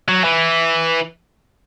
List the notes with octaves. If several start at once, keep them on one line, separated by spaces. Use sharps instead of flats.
F#3
E3